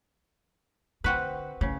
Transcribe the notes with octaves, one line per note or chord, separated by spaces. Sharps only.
D3 C4 F#4 B4
C#3 E4